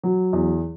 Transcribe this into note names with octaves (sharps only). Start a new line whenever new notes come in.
F#3
E2